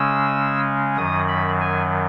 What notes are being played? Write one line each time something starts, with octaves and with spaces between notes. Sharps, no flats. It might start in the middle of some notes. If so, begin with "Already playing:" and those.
Already playing: C#3 G#3 C#4 E6
F#2 D#3 F#3 D#6
B5
G#5